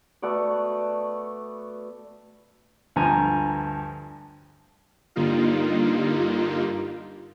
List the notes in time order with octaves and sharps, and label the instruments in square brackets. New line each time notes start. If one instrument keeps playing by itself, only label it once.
[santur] A3 B3 F#4 D5
[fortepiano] D2 G2 F3 G#5 A#5
[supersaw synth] G2 D3 G3 A#3 D#4 F4